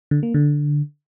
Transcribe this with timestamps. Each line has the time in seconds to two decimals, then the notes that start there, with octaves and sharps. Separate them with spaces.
0.11 D3
0.23 A#3
0.34 D3